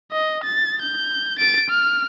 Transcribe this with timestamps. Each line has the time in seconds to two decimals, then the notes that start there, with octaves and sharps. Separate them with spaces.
0.12 D#5
0.44 A6
0.82 G6
1.39 A6 D7
1.70 F6